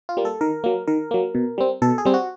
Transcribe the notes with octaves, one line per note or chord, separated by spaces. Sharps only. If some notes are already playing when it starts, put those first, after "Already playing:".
F4
G3 A#3
A4
D#3 A#4
F#3 A#3
D#3 A#4
F#3 A#3
B2
G3 C4
B2 A4
G#4
G3 C4
F#4